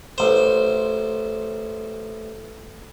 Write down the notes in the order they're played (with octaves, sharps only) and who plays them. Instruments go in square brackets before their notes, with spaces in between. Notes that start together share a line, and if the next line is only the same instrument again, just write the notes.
[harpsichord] A1 C5